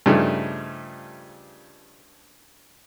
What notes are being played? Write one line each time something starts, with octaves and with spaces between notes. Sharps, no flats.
G2 C#3 F3 A3 D4 D#4